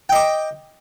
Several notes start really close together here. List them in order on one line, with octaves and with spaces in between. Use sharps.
G5 D#5 D6